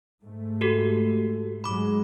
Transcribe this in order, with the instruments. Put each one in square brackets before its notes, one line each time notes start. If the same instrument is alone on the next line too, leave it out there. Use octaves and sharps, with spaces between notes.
[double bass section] G#2 A3
[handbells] F#4 G4 A4
[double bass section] G#2 F#3 G#3 [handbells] B5 D6